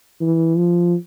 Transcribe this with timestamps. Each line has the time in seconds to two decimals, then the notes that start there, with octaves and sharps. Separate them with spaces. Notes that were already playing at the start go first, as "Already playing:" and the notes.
0.21 E3
0.57 F3